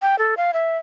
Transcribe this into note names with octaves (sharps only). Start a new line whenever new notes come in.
G5
A4
F5
E5